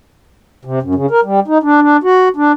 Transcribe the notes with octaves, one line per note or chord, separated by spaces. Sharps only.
C3
F#2
C#3
A#4
G3
D#4
D4
D4
F#4
D4